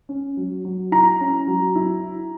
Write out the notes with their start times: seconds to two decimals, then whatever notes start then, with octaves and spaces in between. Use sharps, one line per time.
0.09 C#4
0.37 F#3
0.65 F#3
0.92 E4 A#5
1.21 C#4
1.48 F#3
1.75 E4